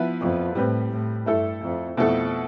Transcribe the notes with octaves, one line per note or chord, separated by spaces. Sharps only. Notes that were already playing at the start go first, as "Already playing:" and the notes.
Already playing: F3 B3 E4 B4
F2
A2 G3 C4 G4 B4
A2
G2 A3 E4 A4
F2
F2 B2 A3 E4 A4